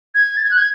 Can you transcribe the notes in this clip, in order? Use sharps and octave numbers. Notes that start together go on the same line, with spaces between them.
G#6
A6
G#6
F#6
G#6